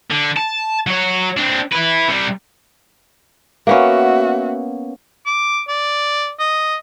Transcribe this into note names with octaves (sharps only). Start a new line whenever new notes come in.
D3
A5
F#3 C#5
C4 D4
E4 B4
C3 G3
A#3 B3 C#4 F#4 E5
D6
D5
D#5